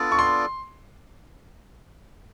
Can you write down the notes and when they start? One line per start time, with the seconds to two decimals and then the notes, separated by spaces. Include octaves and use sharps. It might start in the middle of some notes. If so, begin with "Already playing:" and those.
Already playing: B3 D4 F4 A4 D5
0.12 C#6
0.19 C6